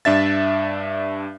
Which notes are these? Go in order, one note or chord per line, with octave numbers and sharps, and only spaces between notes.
G2 D4 E5 A6